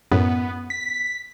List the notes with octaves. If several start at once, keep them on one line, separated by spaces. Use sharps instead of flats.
F#2 A2 B3
B6